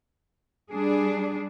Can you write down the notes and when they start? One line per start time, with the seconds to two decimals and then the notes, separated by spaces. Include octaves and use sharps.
0.72 G3 D4 G#4